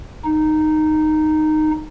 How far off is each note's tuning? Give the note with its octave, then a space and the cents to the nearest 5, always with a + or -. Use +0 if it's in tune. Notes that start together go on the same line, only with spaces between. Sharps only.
D#4 -10